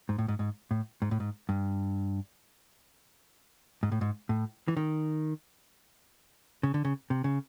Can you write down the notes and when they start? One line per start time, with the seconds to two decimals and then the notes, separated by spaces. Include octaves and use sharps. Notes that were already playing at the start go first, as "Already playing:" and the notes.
0.09 G#2
0.18 A2
0.28 G#2
0.39 G#2
0.71 A2
1.02 G#2
1.11 A2
1.20 G#2
1.49 G2
3.83 G#2
3.92 A2
4.01 G#2
4.29 A2
4.68 E3
4.77 D#3
6.63 C#3
6.74 D3
6.85 C#3
7.10 C3
7.24 C#3